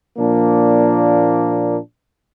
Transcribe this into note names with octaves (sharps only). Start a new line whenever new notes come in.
A#2 F3 A#3 D4